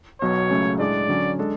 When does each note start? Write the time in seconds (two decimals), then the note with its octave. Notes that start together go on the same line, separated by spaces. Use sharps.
0.21 B1 B2 F#3 C#5
0.50 C#2 C#3 F#3 A3 C#4
0.79 A2 G#3 D4 G#4 D5
1.09 D3 F#3 C#4
1.39 G#3 D4 A4